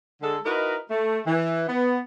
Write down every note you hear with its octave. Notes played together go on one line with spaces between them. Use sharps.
D3 G#3 A4
D#4 E4 F#4 A#4 B4 D#5
A3
E3
B3